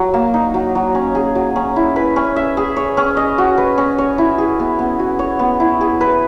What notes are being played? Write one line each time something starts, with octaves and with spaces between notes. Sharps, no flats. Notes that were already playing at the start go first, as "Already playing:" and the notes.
Already playing: F#3
A#3
D#4
F#3
F#3
C#4
G#4
F#3
C#4
E4
B4
C#4
E5
G#4
C#5
C#4
D#5
F#4
B4
C#4
C#5
E4
G#4
B3
B3
F#4
C#5
B3
E4
G#4
B4